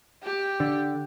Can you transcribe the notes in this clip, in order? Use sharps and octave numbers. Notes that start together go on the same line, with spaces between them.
G4
D3